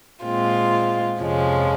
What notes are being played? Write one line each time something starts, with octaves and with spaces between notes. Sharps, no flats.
A#2 G#3 C4 F4
F2 C3 F3 G#3 C#4